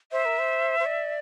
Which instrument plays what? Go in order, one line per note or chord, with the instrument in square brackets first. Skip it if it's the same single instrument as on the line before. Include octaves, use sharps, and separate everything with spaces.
[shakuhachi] C5 [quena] E5
[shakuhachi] A#4
C5
C5
D5